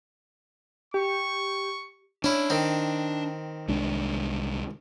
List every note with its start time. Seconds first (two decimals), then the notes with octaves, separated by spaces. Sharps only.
0.94 G4 C#6
2.24 C#4 D4 E4
2.50 D#3 C4
3.68 C2 G#3 D4